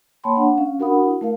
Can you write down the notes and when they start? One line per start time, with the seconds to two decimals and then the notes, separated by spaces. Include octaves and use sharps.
0.24 A#3 C#5 G5 A5 B5 C6
0.35 D4 F#5
0.58 C#4 F5
0.79 D4 F#4 A#4 F#5 B5 D#6
1.03 E4
1.21 A3 A#4 F5